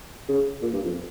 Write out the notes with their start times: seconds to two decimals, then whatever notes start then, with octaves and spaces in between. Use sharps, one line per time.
0.29 C#3
0.62 A#2
0.73 G2
0.85 F2